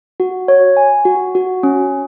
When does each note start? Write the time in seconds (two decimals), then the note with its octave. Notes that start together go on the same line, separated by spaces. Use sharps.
0.20 F#4
0.48 C#5
0.77 G#5
1.05 F#4
1.35 F#4
1.63 C#4